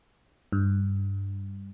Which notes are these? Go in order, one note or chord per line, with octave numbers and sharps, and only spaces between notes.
G2